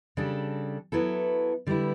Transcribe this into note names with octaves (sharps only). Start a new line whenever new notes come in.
C#3 G3 D4 A4
F#3 B3 E4 A4
D3 G3 B3 E4